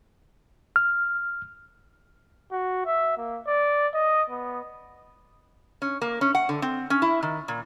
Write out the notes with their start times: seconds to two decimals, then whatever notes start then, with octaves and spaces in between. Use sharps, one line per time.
0.76 F6
2.52 F#4
2.86 E5
3.17 A#3
3.46 D5
3.94 D#5
4.30 B3
5.82 C#4
6.02 A#3
6.21 C#4
6.35 F#5
6.49 D3
6.62 C4
6.90 C#4
7.02 E4
7.23 D#3
7.48 A#2